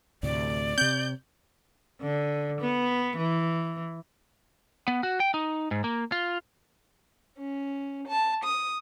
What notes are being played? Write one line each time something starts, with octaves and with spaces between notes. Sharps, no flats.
D2 A2 C3 D5
C3 C4 G6
D3
B3
E3
B3
F#4
G5
D#4
G#2
A#3
F4
C#4
A5
D#6